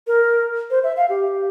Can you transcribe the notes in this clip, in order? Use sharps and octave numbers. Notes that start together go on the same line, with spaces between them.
A#4
C5
E5
F5
G4